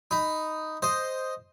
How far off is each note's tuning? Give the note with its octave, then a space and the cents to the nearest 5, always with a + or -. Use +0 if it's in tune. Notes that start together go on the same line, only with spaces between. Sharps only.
D#4 +0 B5 +10
C5 +0 D#5 +0